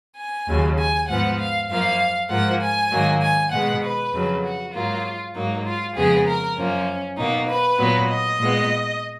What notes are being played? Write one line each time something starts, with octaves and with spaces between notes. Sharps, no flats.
G#5
D#2 C#3 F#3
G#5
G#2 F3 B3 F#5
F5
F#2 F3 A#3 F5
G#2 F3 A#3 F#5
G#5
G#2 D#3 F#3 A#3
G#5
B2 G#3 B3 F#5
B4
F2 C#3 F#3
F#4
G#2 F#3 A#3 F4
G#2 F#3 A#3 D#4
F4
F2 C#3 G#3 B3 G#4
A#4
F#2 F3 A#3 C#4
B2 A#3 D#4
B4
A#2 F#3 B3
D#5
A#2 G#3 B3